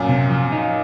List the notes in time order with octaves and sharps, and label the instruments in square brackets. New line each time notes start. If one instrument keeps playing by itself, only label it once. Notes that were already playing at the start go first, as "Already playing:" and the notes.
Already playing: [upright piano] F#2 A#2
[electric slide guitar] C3
F3
D#4